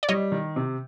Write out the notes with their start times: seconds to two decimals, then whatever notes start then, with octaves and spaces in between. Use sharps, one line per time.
0.03 D5
0.09 G3 C#5 D#5
0.32 D#3
0.56 C3